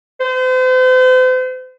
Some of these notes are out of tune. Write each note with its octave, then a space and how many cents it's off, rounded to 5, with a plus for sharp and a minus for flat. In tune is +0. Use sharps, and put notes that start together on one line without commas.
C5 -40